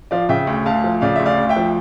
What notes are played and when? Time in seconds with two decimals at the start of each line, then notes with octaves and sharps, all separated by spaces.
0.11 F3 D5 F5
0.29 C#3 E5 G5
0.47 D2
0.66 D2 F5 A5
0.84 F3
1.01 C#3 D5 F5
1.16 D2 E5
1.26 D5 F5
1.37 D2
1.49 E5 G5
1.56 F3